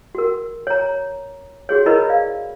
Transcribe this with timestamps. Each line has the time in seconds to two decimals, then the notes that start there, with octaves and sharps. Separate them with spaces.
0.15 F#4 A#4
0.67 C#5 A#5
1.69 F#4 G#4 C#5
1.86 E4 A#4 B4 D#5 B5
2.10 D5 F5